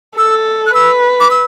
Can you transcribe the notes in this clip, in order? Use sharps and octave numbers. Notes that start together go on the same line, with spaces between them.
A4 E6
F#6
B4 E6
D6
E6